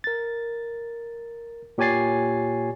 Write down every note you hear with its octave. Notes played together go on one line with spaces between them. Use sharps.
A#4 A6
A#2 G4 C#5 G#5 A6 C7